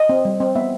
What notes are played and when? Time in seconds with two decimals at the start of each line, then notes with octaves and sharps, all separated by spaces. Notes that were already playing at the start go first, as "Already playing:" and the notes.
Already playing: D#5
0.09 C4
0.25 G3
0.41 C4
0.55 B3 E5